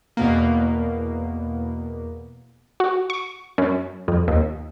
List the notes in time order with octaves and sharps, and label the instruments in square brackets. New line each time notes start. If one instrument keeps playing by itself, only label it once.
[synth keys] E2 B2 A#3
[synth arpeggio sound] F#4
C#6
F#2
F2
D#2